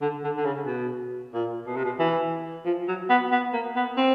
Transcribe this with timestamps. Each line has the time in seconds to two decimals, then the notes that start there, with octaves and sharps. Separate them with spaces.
0.01 D3
0.24 D3
0.36 D3
0.45 C#3
0.67 B2
1.34 A#2
1.67 B2
1.76 C3
1.85 B2
1.99 E3
2.65 F3
2.88 F#3
3.10 B3
3.32 B3
3.53 A#3
3.76 B3
3.97 C4